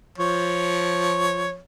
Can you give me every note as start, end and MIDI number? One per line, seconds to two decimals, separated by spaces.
0.18 1.58 53
0.18 1.58 73